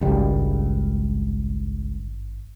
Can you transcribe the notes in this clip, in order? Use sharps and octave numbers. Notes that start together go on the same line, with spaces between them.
G#1 C#2 G2 G3